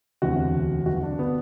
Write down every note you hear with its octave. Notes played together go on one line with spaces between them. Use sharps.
E1 D2 C3 E3 F#4
G1 G2 D3 F#4
D4
B3